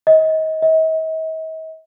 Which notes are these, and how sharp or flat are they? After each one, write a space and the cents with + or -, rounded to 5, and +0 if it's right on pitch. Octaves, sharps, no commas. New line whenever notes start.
D#5 +30
D#5 +45